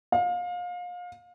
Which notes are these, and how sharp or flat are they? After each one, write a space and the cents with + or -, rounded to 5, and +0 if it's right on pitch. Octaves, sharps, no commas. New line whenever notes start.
F5 +30